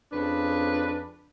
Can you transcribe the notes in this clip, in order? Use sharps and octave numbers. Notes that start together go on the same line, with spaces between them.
F2 C#3 D4 B4